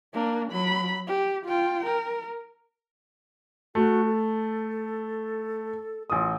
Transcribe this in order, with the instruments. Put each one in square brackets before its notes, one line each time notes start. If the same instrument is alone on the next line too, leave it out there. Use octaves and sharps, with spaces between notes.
[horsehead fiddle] A#3 D4
F#3 B5
G4
F4 G5
A#4
[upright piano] A3 [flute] F#4
[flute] A4
[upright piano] A1 D#6 [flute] F4